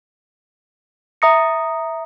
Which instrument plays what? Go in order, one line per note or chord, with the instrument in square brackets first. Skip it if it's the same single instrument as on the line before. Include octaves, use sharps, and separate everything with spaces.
[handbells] E5 A#5 D#6 A#6 C#7